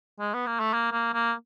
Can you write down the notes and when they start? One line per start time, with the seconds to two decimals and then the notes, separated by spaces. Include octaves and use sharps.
0.20 G#3
0.34 B3
0.47 A#3
0.60 A3
0.73 A#3
0.92 A#3
1.14 A#3